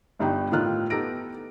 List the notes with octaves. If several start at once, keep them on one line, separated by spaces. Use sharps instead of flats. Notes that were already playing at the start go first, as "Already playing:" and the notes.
G1 G2 G3 D#4 G5
A2 D#3 D#4 F4 F6 F#6
B3 D#4 G4 A4 A#6 D7